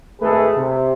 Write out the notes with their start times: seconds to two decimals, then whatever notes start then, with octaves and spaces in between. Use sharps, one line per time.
0.22 G#1 A3 G#4 A4 B4
0.56 C3